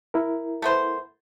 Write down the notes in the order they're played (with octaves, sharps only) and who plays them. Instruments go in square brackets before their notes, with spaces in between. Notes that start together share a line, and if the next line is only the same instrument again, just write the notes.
[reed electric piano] E4 A#4
[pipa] A3 B3 C5